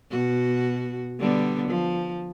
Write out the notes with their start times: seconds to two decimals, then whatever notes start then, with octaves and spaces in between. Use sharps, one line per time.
0.11 B2 F#4
1.19 D3 G3 B3
1.68 F3